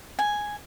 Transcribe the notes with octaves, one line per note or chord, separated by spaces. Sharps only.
G#5